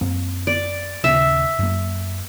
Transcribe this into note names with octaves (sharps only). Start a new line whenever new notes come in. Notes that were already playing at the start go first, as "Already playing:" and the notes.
F#2 A#3 C4
D5
D#1 C#3 C#4 E5
F#2 A#3